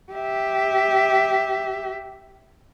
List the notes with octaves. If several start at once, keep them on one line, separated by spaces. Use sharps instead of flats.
G4 E5